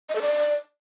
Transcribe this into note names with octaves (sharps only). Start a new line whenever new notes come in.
D#5
A4
D5